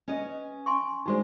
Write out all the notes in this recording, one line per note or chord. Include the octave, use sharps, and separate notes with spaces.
C#4 B4 D#5
G#5 C6 C#6
D#3 G#3 D4 D#4 F#4 C5